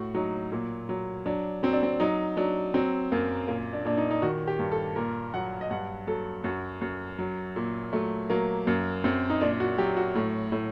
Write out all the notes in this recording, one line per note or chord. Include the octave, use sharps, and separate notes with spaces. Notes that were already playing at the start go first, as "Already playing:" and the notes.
Already playing: A2 F#4
F#3 D#4
A#2
F#3
F#3 D4
F#3 C4
D4
C4
F#3 D#4
F#3 D4
F#3 C4
F#2 A#3
A#2 A#3
D4
A#2 D4
D#4
D#4
D#3 F#4
G4
G2
A4
A#2 A#4
F#3 F#5
D#5
G2 F#5
F#3 A4
F#2 F#4
F#2
F#3
A#2
F#3 A3
F#3 A#3
F#2 A#3
F#2 C4
D#4
A#2 D4
F#4
F#3 G4
F#4
A2
A2